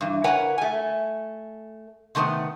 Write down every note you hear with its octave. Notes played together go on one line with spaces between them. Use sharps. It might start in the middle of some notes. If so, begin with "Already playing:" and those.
G2 E3
A#4 B4 C#5 F#5 G#5 A#5
A3 G#5
C3 D#3 A3 B3